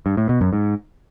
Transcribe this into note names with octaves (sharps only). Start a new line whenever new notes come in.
G2
A2
B2
F#2
G#2